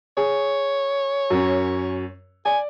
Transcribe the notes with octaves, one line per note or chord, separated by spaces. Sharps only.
G#4 C#5
F#2 C#4
D5 G#5